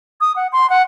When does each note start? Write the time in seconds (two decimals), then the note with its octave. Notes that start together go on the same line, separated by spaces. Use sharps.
0.21 D#6
0.36 F#5
0.53 C6
0.70 F#5